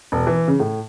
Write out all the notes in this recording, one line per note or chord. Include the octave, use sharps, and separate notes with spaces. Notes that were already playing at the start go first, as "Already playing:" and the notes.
E1
E3
C#3
A2